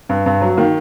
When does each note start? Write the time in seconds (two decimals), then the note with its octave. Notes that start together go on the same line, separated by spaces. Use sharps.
0.09 G2
0.26 G2
0.41 F#3
0.57 D#3 A#3